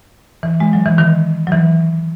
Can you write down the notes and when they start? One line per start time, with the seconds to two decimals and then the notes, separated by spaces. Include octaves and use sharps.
0.43 E3
0.60 G#3
0.73 F#3
0.86 E3
0.98 D#3
1.47 F#3
1.52 E3